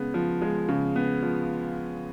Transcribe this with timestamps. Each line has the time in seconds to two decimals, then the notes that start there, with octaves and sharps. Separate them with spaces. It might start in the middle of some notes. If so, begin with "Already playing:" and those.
Already playing: C#3 G#3 B3
0.14 F3
0.42 G#3
0.68 C#3
0.96 B3
1.23 F3